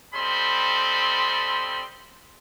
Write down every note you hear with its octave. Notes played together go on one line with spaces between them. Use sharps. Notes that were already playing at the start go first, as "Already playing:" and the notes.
G3 C4 A4 D#5 B5 C6